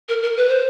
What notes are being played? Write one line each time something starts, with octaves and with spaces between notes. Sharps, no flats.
A#4
A#4
B4
C5